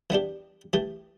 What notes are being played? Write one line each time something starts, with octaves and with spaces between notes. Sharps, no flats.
E3 B3 D4 G4
E3 A3 G4